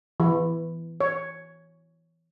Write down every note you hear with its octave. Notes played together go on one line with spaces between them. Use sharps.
E3
C#5